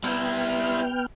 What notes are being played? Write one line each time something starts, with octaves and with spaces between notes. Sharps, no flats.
G3 B3 E4 G5 F6